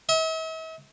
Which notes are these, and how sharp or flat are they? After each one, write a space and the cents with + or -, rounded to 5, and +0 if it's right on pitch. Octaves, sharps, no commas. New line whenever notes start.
E5 -45